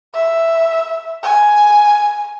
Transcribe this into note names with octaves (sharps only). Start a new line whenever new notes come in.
E5
G#5